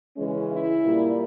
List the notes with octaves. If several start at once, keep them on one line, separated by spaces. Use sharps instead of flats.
C#3 E3 G#3 C#4
E4
A#2 G3 A#3